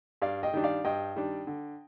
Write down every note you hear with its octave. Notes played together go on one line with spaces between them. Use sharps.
G2 D5 F5
D#5 G5
D#3 G3 D4
D5 F5
G2 D#5 G5
D#3 G3 D4
D3